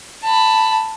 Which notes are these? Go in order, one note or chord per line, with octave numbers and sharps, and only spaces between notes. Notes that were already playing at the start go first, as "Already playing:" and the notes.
A5 B5